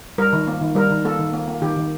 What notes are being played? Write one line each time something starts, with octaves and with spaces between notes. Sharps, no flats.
G3 A#4
D#3
A#3
D#3
G3 A#4
D#3
A#3 A4
D#3
A#3
A#3
D#3 G4
D#3